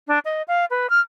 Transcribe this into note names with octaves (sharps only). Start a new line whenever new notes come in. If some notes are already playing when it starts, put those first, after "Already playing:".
D4
D#5
F5
B4
F6